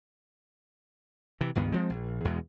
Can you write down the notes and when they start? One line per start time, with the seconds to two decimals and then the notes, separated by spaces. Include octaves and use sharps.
1.41 C3 E3
1.55 C#2 G2 D#3 B3
1.72 F3 G#3 C4
1.90 A#1
2.25 E2 B2 G#3